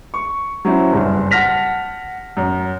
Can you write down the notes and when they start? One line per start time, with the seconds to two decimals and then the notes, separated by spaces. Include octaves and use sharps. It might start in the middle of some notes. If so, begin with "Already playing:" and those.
0.14 C#6
0.65 F#3 C#4 E4 C5
0.92 F#1 C2 G2
1.31 F#5 A5 F6 A#6 B6 F7
2.37 F#2